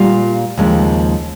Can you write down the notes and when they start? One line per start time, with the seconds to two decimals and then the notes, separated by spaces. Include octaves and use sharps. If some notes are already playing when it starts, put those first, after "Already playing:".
Already playing: A#2 G3 F4
0.57 D#2 C#3 F3 G#3